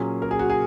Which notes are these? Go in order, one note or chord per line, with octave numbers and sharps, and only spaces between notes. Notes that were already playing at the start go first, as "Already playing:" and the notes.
Already playing: A#2 F#3 A#3 C#4 G#4
A#4
G#4
F#4
G#4